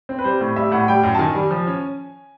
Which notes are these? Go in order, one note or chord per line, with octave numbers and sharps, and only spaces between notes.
C4
B4
G3 C5
A2
G3 E5
A2 F#5
G3 G5
F#2
A5
D#3 G#5
G3
F3
C#4